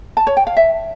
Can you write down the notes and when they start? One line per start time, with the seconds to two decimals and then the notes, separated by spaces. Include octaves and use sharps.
0.17 A5
0.27 C#5
0.37 G5
0.47 F5
0.57 E5